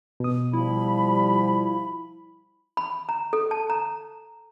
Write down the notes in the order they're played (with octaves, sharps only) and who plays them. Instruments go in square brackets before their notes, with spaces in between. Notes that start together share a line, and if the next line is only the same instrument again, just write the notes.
[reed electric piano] B2 D#6
[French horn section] F3 G3 [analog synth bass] E4 [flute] B5
[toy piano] B5
A#5
A4
A5
A#5